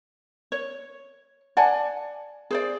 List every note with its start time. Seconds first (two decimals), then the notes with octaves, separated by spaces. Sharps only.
0.52 C#5
1.57 D5 F#5 G#5 A5
2.51 G#4 C5 D5